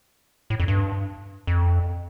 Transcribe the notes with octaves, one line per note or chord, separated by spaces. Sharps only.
A2
F2
G2
F2